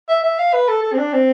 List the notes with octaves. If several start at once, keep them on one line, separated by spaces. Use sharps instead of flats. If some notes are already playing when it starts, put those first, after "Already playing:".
E5
E5
F5
B4
A4
A4
C4
D4
C4